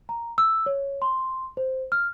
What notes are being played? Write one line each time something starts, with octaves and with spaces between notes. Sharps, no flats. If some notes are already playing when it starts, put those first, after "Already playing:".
A#5
E6
C#5
C6
C5
F6